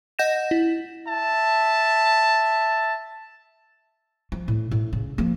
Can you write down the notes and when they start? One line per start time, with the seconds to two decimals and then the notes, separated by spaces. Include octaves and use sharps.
0.19 D#5 F#5 G6 A#6 E7
0.51 E4
1.08 E5 A5
4.32 F3
4.48 A2
4.71 A2
4.93 C#3
5.18 F3 A#3